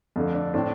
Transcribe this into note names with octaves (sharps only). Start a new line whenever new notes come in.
F2 D3 A3
D4
A2 A3 C4 D4